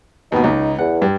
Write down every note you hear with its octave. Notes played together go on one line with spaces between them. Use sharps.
D#2 B2 B3 D#4
C#2 D#4
E2 F#5
G2